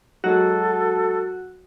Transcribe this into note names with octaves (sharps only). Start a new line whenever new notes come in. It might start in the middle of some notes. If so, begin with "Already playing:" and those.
F#3 G#3 F#4 A4